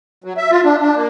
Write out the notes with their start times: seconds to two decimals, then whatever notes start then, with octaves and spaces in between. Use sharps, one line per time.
0.24 F#3
0.37 E5
0.51 F4
0.64 D4
0.81 D4
0.96 A#3